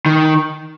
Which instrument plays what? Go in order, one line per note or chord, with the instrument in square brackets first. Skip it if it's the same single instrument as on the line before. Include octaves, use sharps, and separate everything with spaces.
[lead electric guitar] D#3